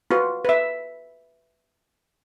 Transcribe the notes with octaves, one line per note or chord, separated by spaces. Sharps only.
F4 F#4 B4
B4 E5